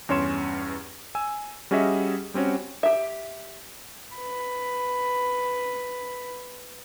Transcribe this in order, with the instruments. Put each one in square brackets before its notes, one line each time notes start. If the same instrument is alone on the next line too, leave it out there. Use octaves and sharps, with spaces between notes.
[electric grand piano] E2 G2 C#4 C#5 C6 E7
G#5 E6
G3 C#4 F#4 G#4 D#5 E5
G3 C4 C#4 F#4 C#5
[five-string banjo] G4 E5
[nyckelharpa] B4 B5